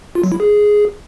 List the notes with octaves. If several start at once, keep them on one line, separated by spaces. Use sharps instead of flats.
F4
F#3
E4
G#4